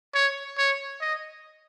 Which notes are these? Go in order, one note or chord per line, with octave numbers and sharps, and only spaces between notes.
C#5
C#5
D#5